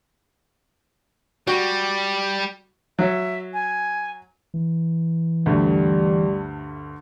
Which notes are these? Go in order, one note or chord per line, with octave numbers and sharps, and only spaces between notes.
G3 F#4
F#3 C#5 E5
G#5
E3
D2 G2 G3 A3